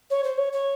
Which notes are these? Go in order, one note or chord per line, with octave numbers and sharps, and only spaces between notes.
C#5
C5
C#5
C#5